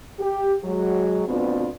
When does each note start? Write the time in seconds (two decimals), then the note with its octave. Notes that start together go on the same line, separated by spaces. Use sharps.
0.19 G4
0.63 F#3 G#3
1.27 D2 B2 B3 C4 D4 F4